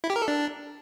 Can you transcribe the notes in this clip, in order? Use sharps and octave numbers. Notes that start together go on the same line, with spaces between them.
E4
G4
A#4
A4
D4